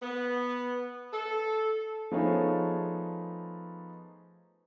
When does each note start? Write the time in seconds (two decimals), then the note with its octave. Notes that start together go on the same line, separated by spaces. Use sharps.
0.03 B3
1.13 A4
2.11 F3 A3 B3 D#4 G#4 C#5